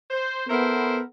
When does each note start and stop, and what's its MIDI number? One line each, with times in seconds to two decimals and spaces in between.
0.11 0.43 72
0.48 1.02 59
0.48 0.98 64
0.48 1.02 69
0.48 0.98 70
0.48 0.98 72